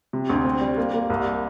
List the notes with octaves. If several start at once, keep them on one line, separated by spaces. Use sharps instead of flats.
C3
D2
C4
G3
A#3
A#3
C2